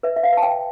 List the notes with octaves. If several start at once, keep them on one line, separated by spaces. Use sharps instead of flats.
B4 E5
E5
F5
B4 A5
G5